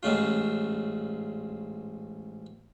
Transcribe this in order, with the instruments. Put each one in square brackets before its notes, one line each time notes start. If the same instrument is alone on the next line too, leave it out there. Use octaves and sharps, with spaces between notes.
[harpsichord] A1 G#2 C#3 F4